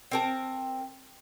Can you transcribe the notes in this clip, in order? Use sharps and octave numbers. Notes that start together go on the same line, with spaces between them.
C4 A#4 A5